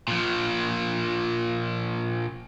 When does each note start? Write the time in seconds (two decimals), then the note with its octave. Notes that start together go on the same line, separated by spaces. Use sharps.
0.08 A#2 F3